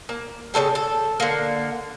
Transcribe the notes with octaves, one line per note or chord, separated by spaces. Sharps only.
A#3
C#3 C4 A4 G5
A4
D3 A#3